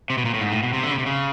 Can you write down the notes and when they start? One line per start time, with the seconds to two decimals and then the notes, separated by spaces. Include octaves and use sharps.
0.10 C3
0.18 B2
0.25 A#2
0.34 A2
0.41 G#2
0.52 A2
0.63 B2
0.73 C3
0.83 D3
0.91 C#3
0.98 C3
1.06 C#3